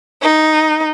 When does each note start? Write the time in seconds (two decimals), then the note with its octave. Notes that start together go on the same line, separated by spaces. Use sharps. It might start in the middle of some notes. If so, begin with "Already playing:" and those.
0.22 D#4